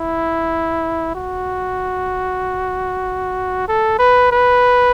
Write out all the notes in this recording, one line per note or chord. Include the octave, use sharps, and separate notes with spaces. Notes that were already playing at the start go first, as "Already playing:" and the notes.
Already playing: E4
F#4
A4
B4
B4